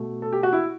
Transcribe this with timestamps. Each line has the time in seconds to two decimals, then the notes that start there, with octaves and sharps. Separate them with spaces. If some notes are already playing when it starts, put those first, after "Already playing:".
Already playing: B2 A3
0.22 A4
0.33 G4
0.43 F#4
0.53 E4